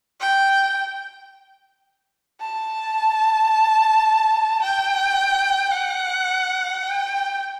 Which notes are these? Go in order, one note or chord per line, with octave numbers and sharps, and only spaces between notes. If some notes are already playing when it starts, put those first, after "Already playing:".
G5
A5
G5
F#5
G5